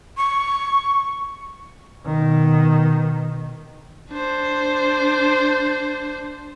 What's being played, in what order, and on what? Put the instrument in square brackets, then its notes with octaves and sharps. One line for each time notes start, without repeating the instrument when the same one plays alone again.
[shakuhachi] C#6
[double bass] B2 D#3
[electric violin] D4 C5